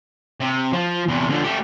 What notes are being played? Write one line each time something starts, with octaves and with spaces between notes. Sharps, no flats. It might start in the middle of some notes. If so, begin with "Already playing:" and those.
C3
F3
E2 C3
D3 F3
A3 G4